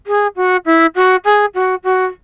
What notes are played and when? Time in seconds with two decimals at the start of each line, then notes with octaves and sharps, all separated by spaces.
0.07 G#4
0.36 F#4
0.65 E4
0.95 F#4
1.25 G#4
1.54 F#4
1.84 F#4